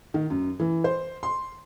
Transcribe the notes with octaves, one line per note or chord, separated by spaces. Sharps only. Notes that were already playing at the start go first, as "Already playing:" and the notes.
D#3
F#2
E3
C5
C6